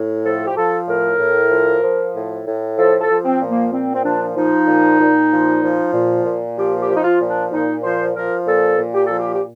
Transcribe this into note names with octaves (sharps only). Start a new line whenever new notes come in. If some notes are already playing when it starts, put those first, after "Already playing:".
Already playing: A2
F3 A4
G4
F3 A4
A2 A#4
A2
F3
F3
A2
A2
F3 A4
A4
F3
C4
A#2
A#3
A#2 C4
C4
F3 D4
F3 D#4
A#2
A#2
F3
F3
A#2
A#2
F3 G4
G4
F3
D#4
F4
A#2
D4
A#2 D#4
F3 C5
F3 A#4
A#2 A4
A#2
G4
F3 A4
G4
G4